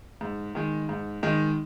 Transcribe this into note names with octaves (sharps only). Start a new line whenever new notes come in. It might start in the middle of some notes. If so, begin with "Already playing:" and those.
G#2
D#3 G#3
G#2
D#3 G#3